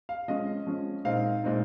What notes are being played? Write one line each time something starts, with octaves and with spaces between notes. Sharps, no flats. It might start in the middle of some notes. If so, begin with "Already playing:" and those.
F5
F3 G#3 C#4 D#5
F3 G#3 C#4
A#2 G#3 C4 D#4 F5
A#2 G#3 C4 D#4